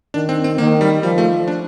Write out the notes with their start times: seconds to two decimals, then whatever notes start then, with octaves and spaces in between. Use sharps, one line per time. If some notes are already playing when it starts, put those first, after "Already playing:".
0.14 D#3 D4
0.29 C4
0.44 C4
0.58 D#3 A#3
0.81 G3
1.03 F3 G3
1.18 A3
1.48 D4